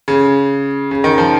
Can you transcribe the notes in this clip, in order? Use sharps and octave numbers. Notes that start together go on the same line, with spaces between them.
C#3
C#3
D#3
F3